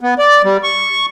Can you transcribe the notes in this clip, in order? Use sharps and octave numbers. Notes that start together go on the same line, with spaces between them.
B3
D5
G3
C#6